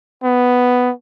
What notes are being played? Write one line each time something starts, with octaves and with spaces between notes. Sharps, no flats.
B3